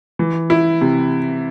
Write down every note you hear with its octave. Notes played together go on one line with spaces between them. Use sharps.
E3
E4
C3